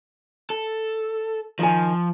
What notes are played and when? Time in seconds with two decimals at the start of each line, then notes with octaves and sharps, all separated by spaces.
0.50 A4
1.59 D#3 F3 G#5